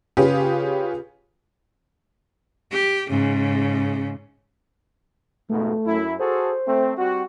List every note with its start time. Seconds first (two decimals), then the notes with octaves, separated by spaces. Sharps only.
0.17 C#3 C#4 F4 G4 G#4 B4
2.71 G4
3.09 G#2 C#3
5.49 F2 G#2 B2 A3
5.86 F#2 E4
6.19 F#4 G#4 A4 C5
6.66 A3 C4
6.97 G3 C4 F#4